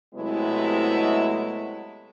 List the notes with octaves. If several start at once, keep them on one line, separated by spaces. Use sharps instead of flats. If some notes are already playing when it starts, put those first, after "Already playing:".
C3 F#3 G#3 A3 B3 E4